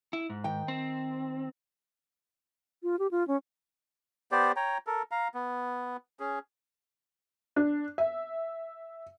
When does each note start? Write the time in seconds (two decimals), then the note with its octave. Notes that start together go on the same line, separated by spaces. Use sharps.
0.13 E4
0.30 G#2
0.44 D#3 G5
0.68 C4
2.83 F4
2.99 G4
3.11 F4
3.28 C#4
4.32 B3 G4 C5 D5
4.56 C#5 G5 A#5
4.87 A4 A#4
5.11 F5 A#5
5.34 B3
6.20 C#4 G#4
7.56 D4
7.98 E5